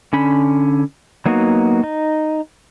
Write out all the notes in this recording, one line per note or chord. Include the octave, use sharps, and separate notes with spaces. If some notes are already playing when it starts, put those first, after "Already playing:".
D3 C#4 B5
F#3 A#3 B3 D#4 F#4
D#4